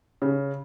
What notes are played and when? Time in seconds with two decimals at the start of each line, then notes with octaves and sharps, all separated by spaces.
0.22 C#3